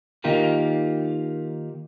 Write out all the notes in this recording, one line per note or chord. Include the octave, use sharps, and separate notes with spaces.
D#3 A#3 D#4 F4 G4 A#4